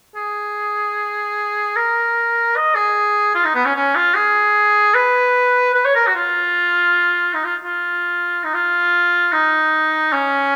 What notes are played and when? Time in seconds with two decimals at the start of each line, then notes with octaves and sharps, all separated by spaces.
0.16 G#4
1.76 A#4
2.56 D#5
2.75 G#4
3.35 F4
3.45 D#4
3.55 B3
3.65 C#4
3.76 C#4
3.95 F4
4.15 G#4
4.94 B4
5.74 B4
5.85 C#5
5.95 A#4
6.07 F#4
6.15 F4
7.34 D#4
7.45 F4
7.64 F4
8.44 D#4
8.54 F4
9.33 D#4
10.13 C#4